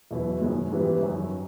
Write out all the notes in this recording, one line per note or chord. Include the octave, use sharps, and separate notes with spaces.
E2 B2 F#3 B3 E4
F#2 D#3 G#3
G#2 E3 G3 B3 E4
F#2 D#3 F#3